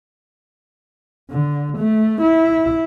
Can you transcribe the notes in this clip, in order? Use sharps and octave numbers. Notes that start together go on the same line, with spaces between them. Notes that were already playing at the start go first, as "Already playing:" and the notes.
D3
A3
E4